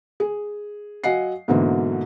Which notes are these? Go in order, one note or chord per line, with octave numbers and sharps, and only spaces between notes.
G#4
F#3 D#5 F5 F#5 G#5 C7
G#2 B2 D3 E3 F#3 A#3